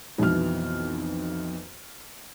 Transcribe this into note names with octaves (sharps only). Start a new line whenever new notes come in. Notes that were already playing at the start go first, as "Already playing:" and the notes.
B1 F2 B2 E3 F6